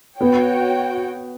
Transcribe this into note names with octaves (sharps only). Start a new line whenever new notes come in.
B3 F#4 C#5 G5